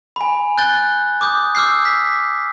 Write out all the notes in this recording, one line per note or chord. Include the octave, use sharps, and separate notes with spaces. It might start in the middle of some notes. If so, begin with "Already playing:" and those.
G#5 B5
F#6 G6 A6 G7
D6 D#6 G6
D6 E6 F6 G6 C7
B6